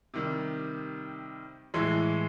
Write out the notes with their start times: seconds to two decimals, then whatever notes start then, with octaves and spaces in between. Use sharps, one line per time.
0.14 C3 D#3 G3
1.74 A2 E3 G#3